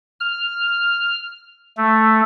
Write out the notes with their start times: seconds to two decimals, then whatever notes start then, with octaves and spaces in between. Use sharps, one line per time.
0.20 F6
1.77 A3